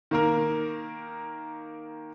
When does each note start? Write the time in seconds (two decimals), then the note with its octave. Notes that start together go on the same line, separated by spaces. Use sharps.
0.11 D#3 A#3 A#4